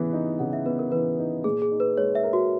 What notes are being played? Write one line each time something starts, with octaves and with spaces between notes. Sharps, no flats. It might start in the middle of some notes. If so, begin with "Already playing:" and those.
Already playing: C#3 E3 B3
D#4
C#3 F#5
E5
B3 B4
A#4
E3 B4
D#4
A#2 G#4
G#4
D#4
B4
G#3 C#5
E5
A#4
F#4